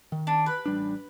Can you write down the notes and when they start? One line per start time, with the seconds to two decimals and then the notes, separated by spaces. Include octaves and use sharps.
0.12 D#3
0.27 D4
0.46 B4
0.66 A1 G3 D4